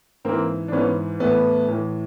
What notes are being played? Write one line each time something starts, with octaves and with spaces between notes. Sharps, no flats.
G#2 E3 A#3 C4
D4
G#2 E3 B3 C#4
A2 E3 A3 B3
A2 E3